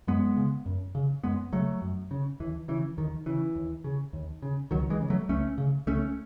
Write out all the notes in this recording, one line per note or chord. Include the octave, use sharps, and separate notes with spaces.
F#2 G#3 B3
C#3
F#2
C#3
F#2 G#3 B3
C#3 F#3 A3
F#2
C#3
D#2 E3
C#3 E3
D#2 D#3
C#3 E3
D#2
C#3
D#2
C#3
C#2 D#3 F#3
E3 G#3
C#3
F#3 A3
C#2 A3 C#4
C#3
C#2 A3 C#4